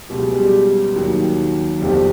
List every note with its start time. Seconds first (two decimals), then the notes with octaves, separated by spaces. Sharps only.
0.09 C#2 B2 F#3 G4
0.22 G#4
0.34 G3 G4
0.95 D#2 D#3 F#3
1.79 G1 F2 C3 G3 G4